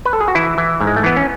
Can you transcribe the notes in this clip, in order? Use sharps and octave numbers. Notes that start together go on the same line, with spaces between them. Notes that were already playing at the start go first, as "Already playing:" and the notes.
B4
A4
G#4
F#4
E3 E4
E3
G#2
G#3
A3
E3 B3
C#4